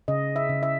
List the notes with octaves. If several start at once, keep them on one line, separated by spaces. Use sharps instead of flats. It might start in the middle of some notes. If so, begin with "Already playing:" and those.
C#3 D#5
E5
C#3
E5